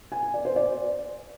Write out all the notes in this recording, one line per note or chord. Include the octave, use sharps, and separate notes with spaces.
G#5
G#5
D5
C5
D5